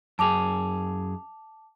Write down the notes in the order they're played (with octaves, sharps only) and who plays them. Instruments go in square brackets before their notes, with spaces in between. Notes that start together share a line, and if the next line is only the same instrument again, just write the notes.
[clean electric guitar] F#2 G#4 [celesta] A5 D6 F7